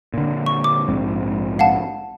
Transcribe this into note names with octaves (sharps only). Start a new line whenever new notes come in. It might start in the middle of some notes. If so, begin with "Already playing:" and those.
A#2 D3
C#6
D6
A#1 G#2 C4
F5 F#5 A5